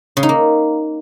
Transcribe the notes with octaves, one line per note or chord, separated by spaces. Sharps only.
C#3
D#4
A#3